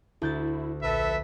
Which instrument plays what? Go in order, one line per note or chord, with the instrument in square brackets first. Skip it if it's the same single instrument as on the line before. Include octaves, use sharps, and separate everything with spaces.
[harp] D2 G6 A6 [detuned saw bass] E4
[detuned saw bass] A#1 [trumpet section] A4 B4 E5